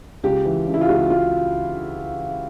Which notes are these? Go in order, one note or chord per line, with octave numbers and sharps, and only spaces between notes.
C#2 G4
E3
C#3
E4
F4
C#2 F#4
C#2 F4